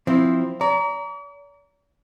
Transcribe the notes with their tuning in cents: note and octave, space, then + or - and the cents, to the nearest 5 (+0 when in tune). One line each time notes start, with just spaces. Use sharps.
F3 +10 C4 +0 E4 +0
D5 -45 A#5 +0